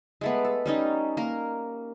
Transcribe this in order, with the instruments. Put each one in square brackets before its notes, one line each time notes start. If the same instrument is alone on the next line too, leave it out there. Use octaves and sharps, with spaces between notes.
[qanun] G#3 A3 B3
A4
G3 C#4 D#4
A#3 A#4